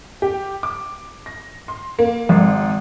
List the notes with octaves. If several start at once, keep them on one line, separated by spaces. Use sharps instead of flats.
G4
D6
A#6
C6
A#3
G#1